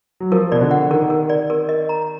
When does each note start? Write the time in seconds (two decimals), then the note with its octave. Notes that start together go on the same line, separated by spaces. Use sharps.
0.20 F#3
0.32 F3 A#4
0.52 B2 D5
0.61 D3
0.71 F#5
0.90 D#3 A#4
1.10 A#4
1.29 D5
1.50 A#4
1.69 D#5
1.89 A#5